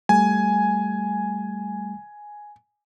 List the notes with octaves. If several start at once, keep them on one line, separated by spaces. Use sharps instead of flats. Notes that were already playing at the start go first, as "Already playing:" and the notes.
G3 A3 G#5